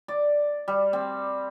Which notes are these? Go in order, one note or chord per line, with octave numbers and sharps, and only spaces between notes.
D5
G3
C4